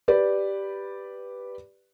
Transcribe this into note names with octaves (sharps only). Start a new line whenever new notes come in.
G4 B4 D5